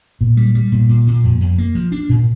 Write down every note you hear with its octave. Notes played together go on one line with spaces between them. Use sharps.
A#2
G3
G3
A#2
A#2
A#2
F2
F2
A#3
F3
D4
A#2